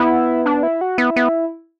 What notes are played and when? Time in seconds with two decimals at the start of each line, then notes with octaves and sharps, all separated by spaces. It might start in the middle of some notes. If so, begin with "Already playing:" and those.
Already playing: B3 E4
0.46 D4
0.63 E4
0.81 F#4
0.98 B3 E4
1.16 B3